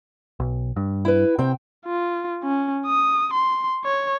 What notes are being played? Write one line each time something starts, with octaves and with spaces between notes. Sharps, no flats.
B1
G2
E4 B4
C3 C4 G5
F4
C#4
D#6
C6
C#5